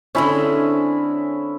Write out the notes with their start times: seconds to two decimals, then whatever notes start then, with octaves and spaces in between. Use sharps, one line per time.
0.15 D3 G#3 C4 C#4 E4 B5